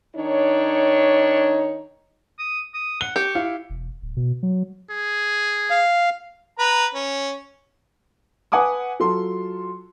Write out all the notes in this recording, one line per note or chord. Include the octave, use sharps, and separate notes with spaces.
D#3 D4 D#4 C#5
D#6
D#6
F#5 G7
G4 C#6
E4 F5
E1
D1
B2
F#3
G#4
F5
B4 A#5
C#4
B4 F#5 G#5 D6 D#6
F#3 F4 A4 C6